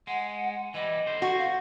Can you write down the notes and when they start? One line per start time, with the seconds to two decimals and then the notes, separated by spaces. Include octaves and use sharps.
0.07 G#3 F#5
0.74 E3 G3 D#5
1.07 D3 C5
1.22 F#4 C#6
1.38 F5